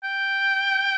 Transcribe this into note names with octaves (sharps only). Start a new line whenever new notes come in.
G5